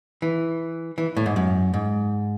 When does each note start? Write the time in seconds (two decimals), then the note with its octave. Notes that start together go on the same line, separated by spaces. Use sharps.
0.22 E3
0.98 E3
1.17 A2
1.26 G#2
1.36 F#2
1.74 G#2